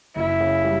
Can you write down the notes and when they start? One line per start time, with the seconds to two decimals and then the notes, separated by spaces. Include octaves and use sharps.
0.16 F#1 E4
0.41 C#3
0.65 G3